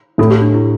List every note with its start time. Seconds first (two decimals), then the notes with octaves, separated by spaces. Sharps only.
0.18 A2 A3 E4 A4
0.31 G4
0.42 D4
0.54 E4